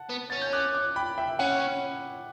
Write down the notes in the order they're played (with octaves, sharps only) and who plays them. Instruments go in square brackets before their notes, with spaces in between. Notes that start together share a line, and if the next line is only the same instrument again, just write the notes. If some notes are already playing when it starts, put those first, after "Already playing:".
Already playing: [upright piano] F#5 A5
[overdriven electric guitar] B3
[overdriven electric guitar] C#4 [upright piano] A6
[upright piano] G6
D6 F#6
D6 F#6
G5 B5
E5 G5
[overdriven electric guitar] C#4 [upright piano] F#5